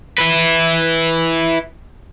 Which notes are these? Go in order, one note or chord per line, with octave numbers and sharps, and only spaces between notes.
E4 B4